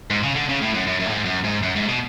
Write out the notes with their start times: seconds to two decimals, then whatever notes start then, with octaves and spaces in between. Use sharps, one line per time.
0.11 G#2
0.23 C#3
0.35 D3
0.49 C#3
0.61 A2
0.74 F#2
0.87 F#2
1.00 F#2
1.06 A2
1.12 G#2
1.25 F#2
1.44 G#2
1.63 F#2
1.76 G#2
1.88 B2